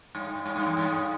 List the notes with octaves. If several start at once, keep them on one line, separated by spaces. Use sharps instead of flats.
G2
G2
G2
E2
G2